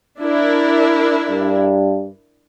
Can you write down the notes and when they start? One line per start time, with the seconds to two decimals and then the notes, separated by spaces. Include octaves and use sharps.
0.19 D4 E4 A#4
1.31 G2